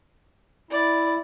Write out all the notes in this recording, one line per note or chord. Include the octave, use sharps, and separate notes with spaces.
E4 D5